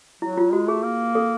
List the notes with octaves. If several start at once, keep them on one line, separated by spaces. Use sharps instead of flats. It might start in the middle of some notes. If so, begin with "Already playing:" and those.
F#3 E4
E4
F4
G#3 F#4
A3 G#4
A#3
A4